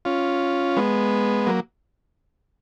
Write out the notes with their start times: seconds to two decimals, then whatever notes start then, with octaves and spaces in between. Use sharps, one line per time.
0.05 C#4 F4
0.77 G#3 B3
1.47 F#3 A#3